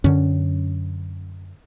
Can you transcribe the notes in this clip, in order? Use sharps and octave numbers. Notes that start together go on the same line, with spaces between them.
F#2 D3 C#4